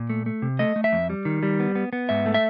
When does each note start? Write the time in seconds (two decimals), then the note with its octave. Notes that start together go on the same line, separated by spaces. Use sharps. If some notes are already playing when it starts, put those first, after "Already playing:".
Already playing: A#2
0.10 A3
0.26 A3
0.42 C3
0.59 A3 D#5
0.76 A3
0.84 E5
0.93 F2
1.10 G3
1.25 D#3
1.43 G3
1.60 B3
1.75 B3
1.93 B3
2.09 G#2 E5
2.26 A3
2.34 E5